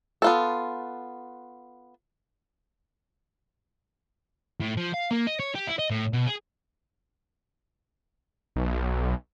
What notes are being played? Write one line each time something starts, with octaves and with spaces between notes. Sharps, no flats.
B3 F4 A4
A2
F3
F5
A#3
D#5
C#5
G4
E4
D#5
A2
B2
G#4
B1